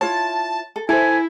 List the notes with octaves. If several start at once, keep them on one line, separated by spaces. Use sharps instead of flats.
E4 F4 C#5 A5
A4
E4 A4 C5 G#5